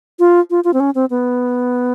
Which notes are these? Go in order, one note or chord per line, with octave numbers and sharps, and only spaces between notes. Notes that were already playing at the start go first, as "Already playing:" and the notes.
F4
F4
F4
C4
C#4
C4
B3